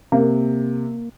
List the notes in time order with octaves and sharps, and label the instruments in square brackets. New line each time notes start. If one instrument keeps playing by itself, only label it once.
[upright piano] C3 [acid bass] A#3